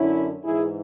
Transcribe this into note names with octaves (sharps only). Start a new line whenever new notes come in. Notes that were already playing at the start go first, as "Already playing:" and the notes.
Already playing: F#2 D3 C#4 E4
G#2 E3 E4 G#4